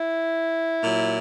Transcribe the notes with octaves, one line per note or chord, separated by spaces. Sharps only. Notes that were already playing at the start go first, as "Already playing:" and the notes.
Already playing: E4
A#2 F#3